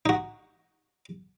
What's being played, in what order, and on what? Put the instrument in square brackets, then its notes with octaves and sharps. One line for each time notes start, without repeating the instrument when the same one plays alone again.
[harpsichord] D#4 F#4